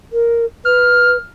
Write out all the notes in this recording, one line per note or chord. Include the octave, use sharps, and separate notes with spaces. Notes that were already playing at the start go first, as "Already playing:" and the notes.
A#4
B4 F6